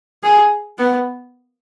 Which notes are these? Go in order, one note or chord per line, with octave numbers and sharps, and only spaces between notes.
G#4
B3